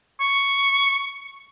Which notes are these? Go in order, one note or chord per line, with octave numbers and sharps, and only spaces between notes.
C#6